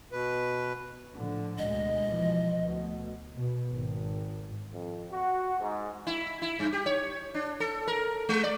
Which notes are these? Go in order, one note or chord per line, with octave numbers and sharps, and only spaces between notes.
B2 B4
A2 D3 F3
D2 B2 G#3 D#5
B2 E3 F3
D2 B2
B2
G#1
F2
F#4
G#2
E4
E4
G2
G4
C#5
D4
A4
A#4
G#3
D5